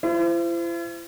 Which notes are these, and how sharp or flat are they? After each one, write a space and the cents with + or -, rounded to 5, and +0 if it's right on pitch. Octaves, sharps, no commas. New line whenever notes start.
E4 +45 C5 -20